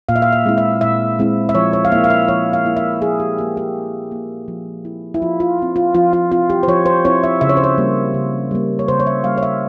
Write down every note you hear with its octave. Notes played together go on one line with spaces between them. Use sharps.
A#2 F5
E5
F5
E5
G#3 C4 E4
E5
A#2 E5
G#3 C4 E4
E5
F3 C#5
C#5
F5
A#3 E4 E5
F5
E5
F3 C#5
F5
A#3 E4
E5
F3 G#4
G4
A#3 E4 G4
G4
F3
A#3 E4
F3
C4 E4
E4
F3 F4
F4
C4 E4
F4
F3 F4
F4
C4 E4 F4
G4
C5
F3 C#5
C5
C4 E4 C#5
E5
C#3 E5
C#5
C5
C#5
G3 A#3
C#3
G3 A#3
C#5
C#3 C5
C#5
E5
G3 A#3 F5
C#5
E5